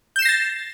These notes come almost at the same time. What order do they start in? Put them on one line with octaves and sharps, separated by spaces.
G6 E7 C7 A#6 A6